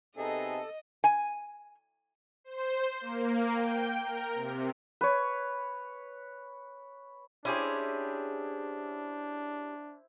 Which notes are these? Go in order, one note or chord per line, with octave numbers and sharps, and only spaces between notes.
C3 B3 D#4 G#4 A4 D#5
G#5
C5
A#3
G5
A#4
C3
B4 C#5
C#4 D4 E4 G4 G#4 C5